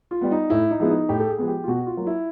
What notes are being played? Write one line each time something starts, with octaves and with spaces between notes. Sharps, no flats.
F4
G3 B3
D#4
A2 E4
D#4
F3 G#3 B3 E4
D#4
A2 G4
A4
G#4
F3 G#3 B3
G4
F4
B2 F#4
F4
F#3 A#3
E4